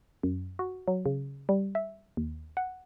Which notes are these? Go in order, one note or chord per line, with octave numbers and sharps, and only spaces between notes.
F#2
F#4
F#3
C#3
G3
E5
D#2
F#5